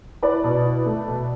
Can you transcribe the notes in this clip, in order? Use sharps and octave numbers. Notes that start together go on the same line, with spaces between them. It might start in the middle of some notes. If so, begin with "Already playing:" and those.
E4 B4 D5
B2
E4
A3
B2